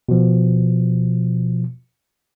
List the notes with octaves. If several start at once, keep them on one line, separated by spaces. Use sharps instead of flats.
B2 F3